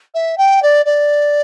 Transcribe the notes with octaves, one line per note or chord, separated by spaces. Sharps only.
E5
G5
D5
D5